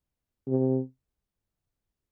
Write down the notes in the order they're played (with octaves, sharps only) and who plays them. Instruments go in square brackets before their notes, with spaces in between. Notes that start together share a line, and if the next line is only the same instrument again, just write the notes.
[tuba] C3